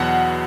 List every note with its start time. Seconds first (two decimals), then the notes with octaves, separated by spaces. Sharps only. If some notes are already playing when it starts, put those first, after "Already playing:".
Already playing: E2 B2 F#3 F#5